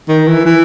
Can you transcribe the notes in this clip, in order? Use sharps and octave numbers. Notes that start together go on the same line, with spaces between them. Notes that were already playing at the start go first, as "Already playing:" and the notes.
D#3
E3
E3